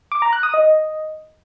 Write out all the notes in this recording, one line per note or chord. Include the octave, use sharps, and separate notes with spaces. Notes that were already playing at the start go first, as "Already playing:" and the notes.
D6
A#5
F#6
D#6
D#5